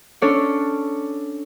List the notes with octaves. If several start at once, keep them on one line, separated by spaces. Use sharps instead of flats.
C#4 D4 A4 C#5 D5